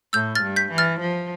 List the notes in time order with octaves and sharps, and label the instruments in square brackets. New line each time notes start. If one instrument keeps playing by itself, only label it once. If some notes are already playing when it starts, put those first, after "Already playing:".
[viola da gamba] A2 [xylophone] E6 G6
[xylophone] F6 A6
[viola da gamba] G2
[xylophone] G6 B6
[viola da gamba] E3
[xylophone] F6 A6
[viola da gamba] F3